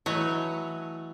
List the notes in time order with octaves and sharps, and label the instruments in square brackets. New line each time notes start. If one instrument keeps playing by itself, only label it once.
[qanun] E3 D#5 [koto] F#3 A3 C#5